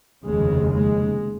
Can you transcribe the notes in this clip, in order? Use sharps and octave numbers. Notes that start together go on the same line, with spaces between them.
F1 D#2 C#3 G#3
G#3